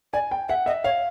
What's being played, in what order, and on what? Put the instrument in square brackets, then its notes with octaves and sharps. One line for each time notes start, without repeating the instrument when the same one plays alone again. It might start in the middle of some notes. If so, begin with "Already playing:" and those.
[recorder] D5 [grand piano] G#5
[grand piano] G5
[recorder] E5 [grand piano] F#5
[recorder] D#5 [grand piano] E5
[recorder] C#5 [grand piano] F5